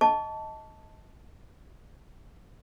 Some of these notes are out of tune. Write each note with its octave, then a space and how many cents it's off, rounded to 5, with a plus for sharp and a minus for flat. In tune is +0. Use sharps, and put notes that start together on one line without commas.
D#5 +15 A5 +0 C#6 +45